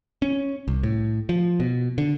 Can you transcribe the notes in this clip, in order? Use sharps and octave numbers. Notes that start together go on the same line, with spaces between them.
C#4
C2
A2
F3
B2
D3